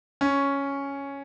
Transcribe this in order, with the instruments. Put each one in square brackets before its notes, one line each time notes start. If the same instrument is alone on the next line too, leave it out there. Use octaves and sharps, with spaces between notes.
[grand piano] C#4